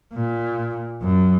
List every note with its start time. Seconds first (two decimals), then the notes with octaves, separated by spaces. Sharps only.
0.14 A#2
1.02 F#2